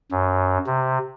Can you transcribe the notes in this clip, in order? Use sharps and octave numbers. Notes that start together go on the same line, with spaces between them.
F#2
C3